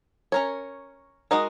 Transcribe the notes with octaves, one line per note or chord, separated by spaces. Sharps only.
C#4 A#4 C#5
G#3 D#4 F#4 A#4 D#5